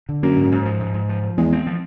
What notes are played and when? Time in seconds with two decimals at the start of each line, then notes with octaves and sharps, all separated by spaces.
0.09 D3
0.23 F#2 A#3
0.36 G#2
0.52 G#2
0.65 F3
0.80 G#2
0.94 G#2
1.09 F3
1.23 F3
1.37 E2 G#3
1.53 C4
1.67 F3